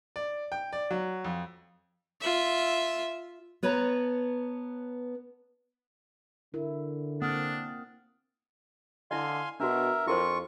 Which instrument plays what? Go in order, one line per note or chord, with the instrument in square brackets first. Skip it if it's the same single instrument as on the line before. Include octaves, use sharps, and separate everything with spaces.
[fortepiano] D5
G5
D5
F#3
F2
[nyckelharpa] F4 E5
[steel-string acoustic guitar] B3 B4 C#5 A5 A#5
[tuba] D3 [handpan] E4 [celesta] A#4
[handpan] A#3 C4 F#5 [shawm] D4 [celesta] D#6 F6
[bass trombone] D3 [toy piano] E4 D#5 [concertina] F5 G#5 C6
[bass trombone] B2 [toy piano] D4 F#4 [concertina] A#4 E5
[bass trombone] F2 [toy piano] E4 A#4 C5 [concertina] F4 C#6